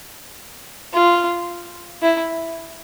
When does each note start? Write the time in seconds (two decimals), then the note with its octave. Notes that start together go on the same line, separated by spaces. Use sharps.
0.93 F4
2.02 E4